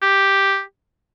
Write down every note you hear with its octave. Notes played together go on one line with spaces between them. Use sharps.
G4